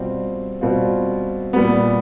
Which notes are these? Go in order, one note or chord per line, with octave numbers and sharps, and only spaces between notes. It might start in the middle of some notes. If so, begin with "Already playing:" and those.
Already playing: B2 G3 C4 F4
B2 G3 C4 F4
A#2 G3 B3